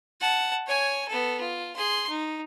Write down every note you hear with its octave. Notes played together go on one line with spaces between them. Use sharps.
F#5 A5
C#5 G#5
B3 A4
F4
G#4 C6
D#4